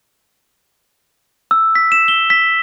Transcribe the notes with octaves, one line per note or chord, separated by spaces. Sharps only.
E6
B6
E7
G7
B6